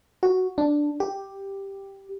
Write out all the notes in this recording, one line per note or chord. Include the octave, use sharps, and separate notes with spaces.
F#4
D4
G4